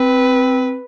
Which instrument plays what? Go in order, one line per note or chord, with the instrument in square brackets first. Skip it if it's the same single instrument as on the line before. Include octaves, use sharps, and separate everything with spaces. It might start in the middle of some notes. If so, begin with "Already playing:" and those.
Already playing: [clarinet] C4 [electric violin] B4